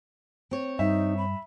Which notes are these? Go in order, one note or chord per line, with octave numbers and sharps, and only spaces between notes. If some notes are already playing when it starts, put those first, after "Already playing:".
C4 C#5
G2 D#4 E5
B5